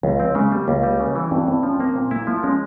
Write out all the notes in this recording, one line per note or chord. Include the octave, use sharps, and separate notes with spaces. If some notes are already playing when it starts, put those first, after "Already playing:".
C#2 F3
C4
C#3 G#3
G3 A#3
C#2 A#3
G3
C#3
E3
G2 C4
G2 C4
F3 C#4
A#3 C4
A#2 C4
A#3 E4
F3 A#3
G#3 C#4